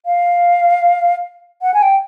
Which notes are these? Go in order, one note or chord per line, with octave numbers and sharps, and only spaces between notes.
F5
F#5
G#5
G5